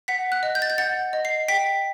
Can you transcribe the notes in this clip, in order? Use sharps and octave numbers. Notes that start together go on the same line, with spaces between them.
F#5 B6
F#6
D#5
G6
A6
G6
F#5 A6
D#5
C7
G5 B6